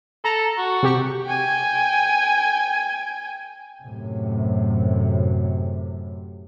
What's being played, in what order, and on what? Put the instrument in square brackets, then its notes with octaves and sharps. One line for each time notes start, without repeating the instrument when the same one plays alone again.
[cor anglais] A4 [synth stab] A#5
[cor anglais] F#4
[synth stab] C3 G4 C#6
[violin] G5 G#5
[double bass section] F#2 A2 C3